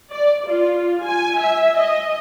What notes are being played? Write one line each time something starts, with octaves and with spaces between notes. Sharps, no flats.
D5
F4
G#5
E5
D#5